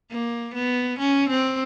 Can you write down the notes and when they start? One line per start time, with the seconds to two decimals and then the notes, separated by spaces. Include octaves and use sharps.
0.11 A#3
0.54 B3
0.99 C#4
1.29 C4